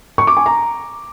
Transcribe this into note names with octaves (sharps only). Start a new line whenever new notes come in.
C#6
D6
G#5
A#5